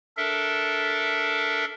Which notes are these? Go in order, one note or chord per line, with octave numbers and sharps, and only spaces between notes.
D4 A4 A#4 E5